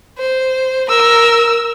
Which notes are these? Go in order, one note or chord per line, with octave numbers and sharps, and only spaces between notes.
C5
A#4 E6